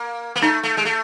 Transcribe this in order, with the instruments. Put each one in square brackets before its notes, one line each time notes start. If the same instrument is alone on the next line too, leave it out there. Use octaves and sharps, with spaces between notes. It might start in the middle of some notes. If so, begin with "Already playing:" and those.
Already playing: [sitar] A#3
A#3
[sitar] A3 [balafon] D#4
[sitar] A3
G#3
A3